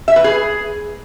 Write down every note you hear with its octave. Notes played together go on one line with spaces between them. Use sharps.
E5
B4
G#4